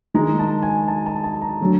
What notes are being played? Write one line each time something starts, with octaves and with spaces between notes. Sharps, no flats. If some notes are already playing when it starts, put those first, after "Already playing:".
D#3 G#3 A#5
A5
G#5
A5
A5
A5
A#5
D3 F#3 A3